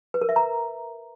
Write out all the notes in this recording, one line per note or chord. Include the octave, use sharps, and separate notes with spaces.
B4
A#4
E5
A#5